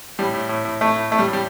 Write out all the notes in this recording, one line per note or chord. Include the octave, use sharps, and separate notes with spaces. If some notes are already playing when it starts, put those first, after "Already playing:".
A2 G3
A2
A2
A2
A2 A3
A2
A2 A3
G3
A2
G3